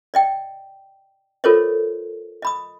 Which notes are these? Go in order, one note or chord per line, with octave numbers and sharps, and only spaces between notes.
D5 D#5 G5
F4 A4 A#4 C5 C#5 D#5
D#5 B5 D#6